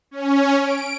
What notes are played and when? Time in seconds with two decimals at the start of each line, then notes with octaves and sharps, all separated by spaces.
0.11 C#4
0.60 D7